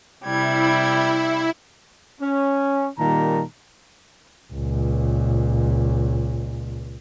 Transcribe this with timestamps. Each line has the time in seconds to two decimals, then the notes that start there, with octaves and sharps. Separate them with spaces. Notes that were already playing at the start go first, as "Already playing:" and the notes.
0.24 C3 G3 E4 G#6
2.20 C#4
2.99 A#2 D#3 G3 A5 A#5
4.53 C#2 A#2